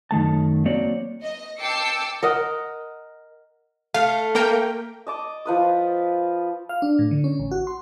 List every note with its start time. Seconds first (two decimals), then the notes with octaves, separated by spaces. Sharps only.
0.11 F#2 D#3 A3 A5
0.65 F#3 A#3 C4 C#5 D5
1.23 D#5
1.60 G5 A5 D6 E6 C7 C#7
2.23 A#4 D#5 F#5
3.94 A3 F5
4.35 A#3 A#4 G5
5.07 D#5 A5 D6
5.45 F3 B4 D#6
6.69 F5
6.82 D4
6.99 A2
7.11 D3
7.24 C#4
7.39 A1
7.51 F#4
7.67 C6